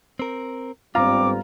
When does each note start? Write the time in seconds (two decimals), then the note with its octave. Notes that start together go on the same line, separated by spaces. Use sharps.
0.19 C4 A#4
0.95 G1 G#2 G3 C4 F4 F5 A#5 D6